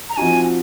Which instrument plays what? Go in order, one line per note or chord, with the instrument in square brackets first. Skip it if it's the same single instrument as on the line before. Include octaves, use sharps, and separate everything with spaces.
[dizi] A#5
[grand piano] F3 C4 D#4 F#4 [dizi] G#5